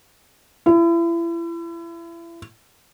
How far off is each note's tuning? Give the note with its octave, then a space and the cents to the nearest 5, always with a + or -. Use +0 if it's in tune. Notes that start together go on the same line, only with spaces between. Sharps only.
E4 +35